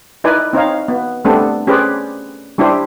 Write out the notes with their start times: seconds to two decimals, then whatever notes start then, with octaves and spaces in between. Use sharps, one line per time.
0.24 D#4 E4 B4 D5 G#5
0.53 C4 D#4 C#5 F5
0.88 B3
1.25 G3 A3 B3 C4 D4 A4
1.67 C#4 G4 G#4 B4 C5 D5
2.58 G3 D4 E4 G4 C5